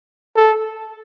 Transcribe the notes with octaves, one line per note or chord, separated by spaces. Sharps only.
A4